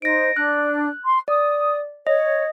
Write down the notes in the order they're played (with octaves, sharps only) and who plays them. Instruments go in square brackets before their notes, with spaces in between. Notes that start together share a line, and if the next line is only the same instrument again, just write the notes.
[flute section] D#4 C5 D#5 [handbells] A#6 D7
[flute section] D4 [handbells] F#6
[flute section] C6
[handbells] D5 [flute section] D#6
[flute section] C#5 [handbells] D#5